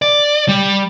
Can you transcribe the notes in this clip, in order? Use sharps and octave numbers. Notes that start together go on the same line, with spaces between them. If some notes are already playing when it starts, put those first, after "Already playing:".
D5
G3